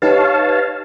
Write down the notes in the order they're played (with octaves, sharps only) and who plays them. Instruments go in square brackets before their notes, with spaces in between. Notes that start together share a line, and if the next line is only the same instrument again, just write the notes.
[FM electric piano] D#4 G4 B4 [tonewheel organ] C#5 F5 A5